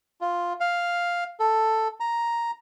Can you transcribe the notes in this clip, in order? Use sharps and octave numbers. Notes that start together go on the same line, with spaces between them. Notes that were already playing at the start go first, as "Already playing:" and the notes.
F4
F5
A4
A#5